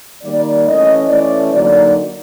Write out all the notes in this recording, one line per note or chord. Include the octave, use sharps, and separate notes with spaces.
D#3 G3 A#3 D5
E3 A3 C#4 D#5
E3 A3 C#4 D5
D3 F#3 A#3 D#4 D5